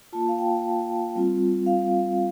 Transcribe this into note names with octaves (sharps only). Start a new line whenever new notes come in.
A#3 F4 A5
F5
G5
G3 C4 F4
F5